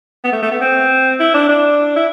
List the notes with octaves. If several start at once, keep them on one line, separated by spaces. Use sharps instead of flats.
B3
A3
A3
B3
C4
E4
D4
D4
E4